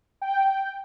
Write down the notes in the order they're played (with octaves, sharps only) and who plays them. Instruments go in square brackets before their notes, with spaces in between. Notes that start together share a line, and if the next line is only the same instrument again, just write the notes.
[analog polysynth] G5